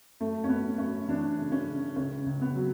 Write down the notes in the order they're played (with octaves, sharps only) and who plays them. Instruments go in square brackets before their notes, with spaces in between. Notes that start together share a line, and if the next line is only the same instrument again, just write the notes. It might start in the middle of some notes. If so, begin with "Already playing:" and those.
[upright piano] F#2 A3
C#4
F#2 B3
F#2 C#4
E3 D4
C#3
C#4
C#3
C#2 C#4
C#2
B3
F#3